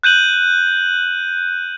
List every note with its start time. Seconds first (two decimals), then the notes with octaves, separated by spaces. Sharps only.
0.03 F#6 G6 D#7 F#7